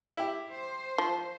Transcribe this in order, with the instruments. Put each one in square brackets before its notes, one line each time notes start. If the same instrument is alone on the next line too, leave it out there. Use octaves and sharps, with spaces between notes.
[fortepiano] E4 G4
[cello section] C5
[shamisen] F3